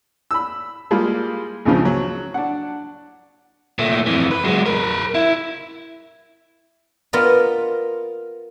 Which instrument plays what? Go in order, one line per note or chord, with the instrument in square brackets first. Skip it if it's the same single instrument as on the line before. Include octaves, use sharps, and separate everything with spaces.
[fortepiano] B5 E6
G3 G#3 A#3 F4
G#1 C#2 C#3 F3
F#3
D4 F#5
[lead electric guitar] A#2 A3
F2 E3
B4
F#3 G#3
A#4 B4
E4
[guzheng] B3 F4 A#4 D5 D#5